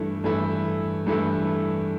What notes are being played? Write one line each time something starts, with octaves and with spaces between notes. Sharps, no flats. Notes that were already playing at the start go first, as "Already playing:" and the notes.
Already playing: G2 E3 A3 E4
G2 E3 A3 E4
G2 E3 A3 E4